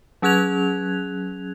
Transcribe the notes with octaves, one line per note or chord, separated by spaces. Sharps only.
F#3 C#4 G#4 F#6 G#6 F7